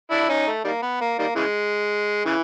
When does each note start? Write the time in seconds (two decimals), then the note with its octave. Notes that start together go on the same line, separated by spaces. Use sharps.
0.11 D4 E4
0.29 C#4 D#4
0.47 A3
0.64 D#3 G3 A#3
0.82 B3
1.01 A#3
1.19 D#3 G3 A#3
1.36 C#3 E3 G#3
2.25 C#3 E3